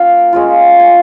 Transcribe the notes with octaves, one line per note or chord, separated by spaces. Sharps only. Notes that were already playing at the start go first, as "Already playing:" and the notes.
Already playing: A#3 C#4 F4 F5 G5
G#3 C#4 F4
G#5